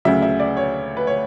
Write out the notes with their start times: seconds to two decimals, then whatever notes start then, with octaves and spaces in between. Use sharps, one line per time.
0.05 D2 C#3 F#3 E5
0.22 E5
0.40 D5
0.57 C#5
0.97 B4
1.07 C#5